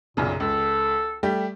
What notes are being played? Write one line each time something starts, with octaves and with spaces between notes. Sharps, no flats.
B1 F#2 A#2 C#3
C#2 A4
G3 A3 G4